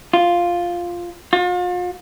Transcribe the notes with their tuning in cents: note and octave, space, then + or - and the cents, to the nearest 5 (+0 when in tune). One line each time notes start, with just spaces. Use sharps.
F4 +0
F4 +40